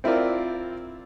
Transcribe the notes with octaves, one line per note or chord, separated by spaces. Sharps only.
C4 E4 F4 A#4 D5